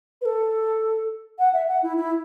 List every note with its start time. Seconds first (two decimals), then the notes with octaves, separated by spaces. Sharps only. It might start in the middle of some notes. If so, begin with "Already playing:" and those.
0.21 B4
0.25 A4
1.39 F#5
1.53 E5
1.68 F#5
1.83 E4
1.97 E4